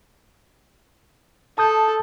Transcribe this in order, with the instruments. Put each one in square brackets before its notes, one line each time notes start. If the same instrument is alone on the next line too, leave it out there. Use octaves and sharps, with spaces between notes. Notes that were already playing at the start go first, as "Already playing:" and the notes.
[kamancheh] A4 [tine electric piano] A5 D#6 G6